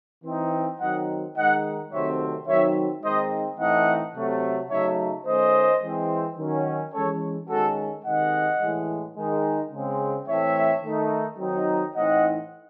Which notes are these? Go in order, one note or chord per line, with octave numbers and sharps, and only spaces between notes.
E3 C4 D#4
D#3 F#3 C4 D#4 D#5 F#5
D#3 G#3 D#4 D#5 F#5
C3 D#3 F#3 A3 C4 C#5 E5
D#3 F#3 C4 D#4 C#5 E5
D#3 G#3 C4 D#4 C5 D#5
A2 E3 A3 C4 D#4 D#5 F#5
C3 F#3 A3
C#3 F#3 A3 D#4 C#5 E5
D#3 A3 C#4 C5 D#5
E3 G#3 C4
D#3 F#3 C#4
E3 G#3 C#4 A4 C#5
D#3 G#3 C#4 F#4 A4
C3 D#3 G#3 D#5 F#5
A2 E3 G#3
D#3 G#3 D#4
C#3 G#3 C4
A2 E3 A3 C4 C#5 E5
D#3 A3 D#4
D#3 F#3 C4 D#4
A2 E3 C4 D#4 D#5 F#5